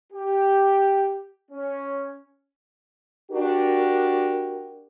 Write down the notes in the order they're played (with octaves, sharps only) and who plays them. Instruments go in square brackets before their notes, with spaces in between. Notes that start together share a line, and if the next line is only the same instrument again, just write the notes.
[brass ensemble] G4
C#4
[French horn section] D4 F#4 G4 A#4